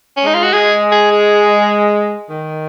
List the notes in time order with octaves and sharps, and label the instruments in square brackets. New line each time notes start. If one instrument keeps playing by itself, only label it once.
[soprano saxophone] C#4
[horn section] G#3 [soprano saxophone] D#4
[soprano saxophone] F4
F#4
[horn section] G#3 [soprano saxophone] G#4
[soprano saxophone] G#4
G#4
[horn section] D#3